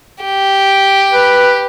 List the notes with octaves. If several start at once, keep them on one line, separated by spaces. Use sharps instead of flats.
G4
B4